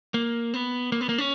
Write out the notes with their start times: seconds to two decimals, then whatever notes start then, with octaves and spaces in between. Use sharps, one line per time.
0.14 A#3
0.54 B3
0.92 A#3
1.01 B3
1.09 A#3
1.18 C#4